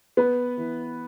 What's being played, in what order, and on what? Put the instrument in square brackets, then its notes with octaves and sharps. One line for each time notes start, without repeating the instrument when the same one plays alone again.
[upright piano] B3 B4
E3